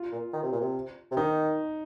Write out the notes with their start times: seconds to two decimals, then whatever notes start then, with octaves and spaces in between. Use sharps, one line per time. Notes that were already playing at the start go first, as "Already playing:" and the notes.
Already playing: F4
0.12 A#2
0.33 D#3
0.43 C3
0.52 A#2
0.61 C3
1.11 C3
1.17 D#3 D#4